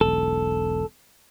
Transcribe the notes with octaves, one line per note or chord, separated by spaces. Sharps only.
E1 B1 A4